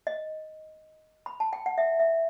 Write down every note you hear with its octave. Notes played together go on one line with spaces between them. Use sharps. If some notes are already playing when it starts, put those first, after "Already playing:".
D#5
B5
A5
G5
F#5
E5
E5